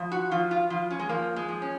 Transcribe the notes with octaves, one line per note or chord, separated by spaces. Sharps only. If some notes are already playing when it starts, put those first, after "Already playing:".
Already playing: F3
F#4
F3 F4
F4
F3 F4
C#4
G#3
F3 A#3
G#3
F3
C#4